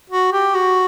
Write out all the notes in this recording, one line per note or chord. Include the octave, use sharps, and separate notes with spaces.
F#4
G4
F#4